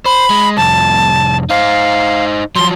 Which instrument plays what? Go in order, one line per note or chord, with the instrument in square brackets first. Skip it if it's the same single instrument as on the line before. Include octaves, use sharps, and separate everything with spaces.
[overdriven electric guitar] C5 [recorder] B5
[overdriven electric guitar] G#3
[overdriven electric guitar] C2 F2 [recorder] A5
[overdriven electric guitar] D#4 C5 [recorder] F5
[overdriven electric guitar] F3 F#3 [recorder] C6